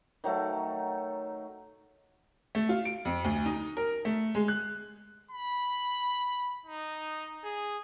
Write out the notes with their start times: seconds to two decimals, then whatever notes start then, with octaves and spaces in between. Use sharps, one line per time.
0.24 D#3 F#3 A3
2.55 A3
2.69 F4
2.85 D7
3.05 F2
3.24 D2
3.46 D#4
3.77 A#4
4.05 A3
4.35 G#3
4.48 F#6
5.31 B5
6.66 D#4
7.44 G#4